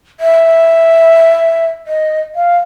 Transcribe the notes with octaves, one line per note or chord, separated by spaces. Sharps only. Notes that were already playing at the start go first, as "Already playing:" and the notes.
E5
D#5
F5